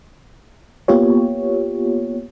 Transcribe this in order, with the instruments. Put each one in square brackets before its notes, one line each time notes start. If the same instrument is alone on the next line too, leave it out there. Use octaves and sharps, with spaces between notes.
[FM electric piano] A#3 B3 F4 G4 C#5